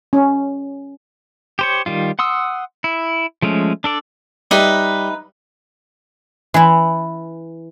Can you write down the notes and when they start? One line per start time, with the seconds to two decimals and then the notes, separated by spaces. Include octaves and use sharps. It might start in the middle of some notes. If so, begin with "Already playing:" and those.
0.13 C#4
1.59 G4 C5 C#5
1.86 D#3 G3 F4
2.19 F#5 C6 D#6 E6
2.84 E4
3.42 F3 G#3 A3 C#4
3.84 D4 A4 D5
4.51 G3 D#4 B4 E5
6.54 E3 E4